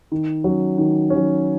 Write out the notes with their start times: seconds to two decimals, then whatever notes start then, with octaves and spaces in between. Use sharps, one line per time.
0.12 D#3
0.44 F#3 C#4
0.78 D#3
1.10 C#4
1.15 F#3